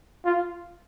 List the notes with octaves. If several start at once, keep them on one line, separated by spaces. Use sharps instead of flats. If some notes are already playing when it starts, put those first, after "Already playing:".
F4